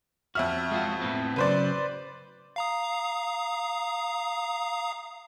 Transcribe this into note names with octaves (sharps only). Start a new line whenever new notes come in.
F2 F#4 E5 F6
G#3 F4 F#4
A2 B3 C4
C#3 F3 F#3 B4 C5 D5
F5 A#5 D#6